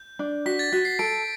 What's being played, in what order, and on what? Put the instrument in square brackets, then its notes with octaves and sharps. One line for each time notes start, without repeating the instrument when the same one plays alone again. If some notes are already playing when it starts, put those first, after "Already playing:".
Already playing: [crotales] G6
[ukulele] D4
[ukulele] F#4 [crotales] B6
[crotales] A6
[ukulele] F#4 [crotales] B6
[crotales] C7
[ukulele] A4 [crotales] D7